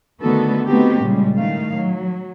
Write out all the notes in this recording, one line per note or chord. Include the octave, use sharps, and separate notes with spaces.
D3 D#3 A3 B3 F#4 A4
A3 B3 C4 D#4 F#4 G4
A#2 C#3 G3 G#3
A2 D#3 A3 F5
F#3